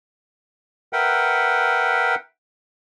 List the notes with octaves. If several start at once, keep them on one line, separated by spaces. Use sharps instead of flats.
A#4 B4 E5 F#5 G5